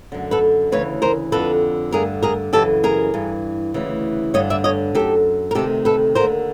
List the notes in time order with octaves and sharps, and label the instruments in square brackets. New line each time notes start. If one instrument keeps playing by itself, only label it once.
[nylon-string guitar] F#2 D3
A4 B4
D2 C#3 E3 B4 C#5
A#4 C5
F2 D3 A4 B4
G2 D3 G#4 A#4
G#4 A#4
F#2 C#3 E3 G4 A4
G#4 A#4
G2 E3
D2 C#3 E3
G2 D3 C#5 D#5
D5 E5
C#5 D#5
F#2 D#3 G4 A4
A#4
D2 C3 D#3 G4 A4
A4 B4
D#2 D3 A#4 C5